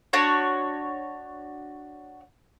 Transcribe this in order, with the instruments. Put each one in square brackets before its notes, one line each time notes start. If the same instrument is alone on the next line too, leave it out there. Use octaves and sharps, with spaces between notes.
[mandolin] D4 F#4 C#5